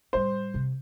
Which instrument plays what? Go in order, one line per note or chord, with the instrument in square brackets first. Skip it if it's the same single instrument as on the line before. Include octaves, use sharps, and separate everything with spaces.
[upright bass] A2 G3 [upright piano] C5
[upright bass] C3